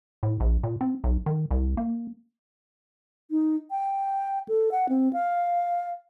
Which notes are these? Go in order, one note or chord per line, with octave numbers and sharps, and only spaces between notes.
A2
A#1
A#2
C4
B1
D#3
C2
A#3
D#4
G5
A4
F#5
C4
F5